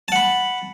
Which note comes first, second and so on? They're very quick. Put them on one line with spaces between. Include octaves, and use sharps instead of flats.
A5 F#5 B5